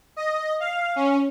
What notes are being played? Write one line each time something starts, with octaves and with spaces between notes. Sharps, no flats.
D#5
F5
C#4